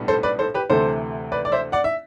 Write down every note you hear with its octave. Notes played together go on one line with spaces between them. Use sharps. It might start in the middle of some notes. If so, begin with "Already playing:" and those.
Already playing: B1 A2 G3 B3 D4
A4 C5
B4 D5
A4 C5
G4 B4
D2 C3 E3 A3 A4 C5
B4 D5
D5
C5 E5
D5 F#5
E5